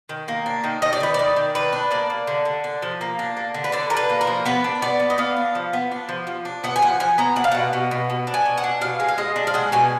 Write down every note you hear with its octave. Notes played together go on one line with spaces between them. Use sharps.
D#3
A#3
D4
D#3
D#3 D#5
D5
D#3 B4
D5
D#3
D#3
D4 B4
D4
A#3 D5
A#3
D3
D3
D4
F3
A#3
D4
A#3
D3
B4
D3 D5
D4 A#4
B4
A#3
A#4
F3
B3 B4
D4
B3 D5
B3
D#5
B3 F5
D4
F3
B3
D4
F3
F3
D4
B3 F#5
G#5
F3 F#5
F3 G#5
B3 A#5
D4 F#5
F5
B2 F#5
B2
B2
B2
D4
G#5
B2
F#5
D4
B2 F5
G#3
F5
G#3 D#5
D4
F5
G#3 F#5
B2 G#5